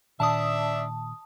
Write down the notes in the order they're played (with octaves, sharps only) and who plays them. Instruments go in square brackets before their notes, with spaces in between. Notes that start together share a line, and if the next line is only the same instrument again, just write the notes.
[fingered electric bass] A#2 D#3 [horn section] D4 E5 [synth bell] A5 D#6